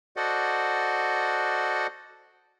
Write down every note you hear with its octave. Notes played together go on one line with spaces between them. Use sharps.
F#4 A4 C5 D5 D#5 F#5